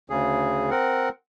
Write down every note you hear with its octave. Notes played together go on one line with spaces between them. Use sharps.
D2 C#3 G#4
C4 A#4 F#5